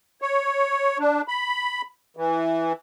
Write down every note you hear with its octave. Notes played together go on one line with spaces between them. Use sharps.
C#5
D4
B5
E3